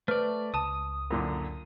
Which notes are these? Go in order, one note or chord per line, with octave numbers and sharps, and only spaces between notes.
A3 B4 C5 D5 F6
C#2 A5 D#6 D#7
F#2 A#2 D3